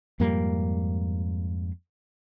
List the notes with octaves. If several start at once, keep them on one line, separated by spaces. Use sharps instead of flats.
F2 G#2 G3 A#3